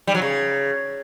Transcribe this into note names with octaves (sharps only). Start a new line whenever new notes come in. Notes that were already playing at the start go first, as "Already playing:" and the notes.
G3
F#3
C#3